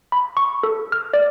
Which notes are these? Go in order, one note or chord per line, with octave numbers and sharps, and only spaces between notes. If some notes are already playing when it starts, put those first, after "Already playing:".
B5
C#6
A4
F6
D5